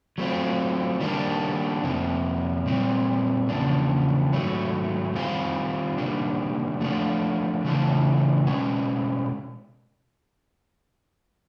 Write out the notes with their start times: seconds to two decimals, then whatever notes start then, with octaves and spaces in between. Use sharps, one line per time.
0.18 F#3 A3 C4 F4
1.00 D#3 G3 A#3 D4
1.83 F2 C3 F3 A#3
2.66 A#2 G3 C4
3.49 E2 C#3 F3 A#3 D4
4.33 G#2 D#3 F#3 A3
5.15 D#3 G3 C4 F4 G#4
5.98 C3 D#3 G3 A#3 D4
6.81 F3 A3 D4 F4
7.64 C#3 E3 A3 D4 F4
8.47 B2 G#3 C#4